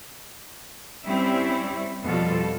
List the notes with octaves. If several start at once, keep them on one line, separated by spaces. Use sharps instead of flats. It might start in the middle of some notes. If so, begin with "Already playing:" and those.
G3 C4 C#4 E4 E5
F2 B2 F3 G3 F4 A4